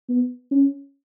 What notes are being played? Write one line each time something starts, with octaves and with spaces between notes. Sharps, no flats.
B3
C#4